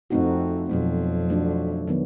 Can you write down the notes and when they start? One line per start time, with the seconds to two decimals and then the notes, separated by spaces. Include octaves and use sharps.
0.10 F2 A3 C4 D#4 F#4
0.69 F2 B2 F#3 A3
1.29 F#3 A3 D4 F#4
1.87 D#3 F#3 B3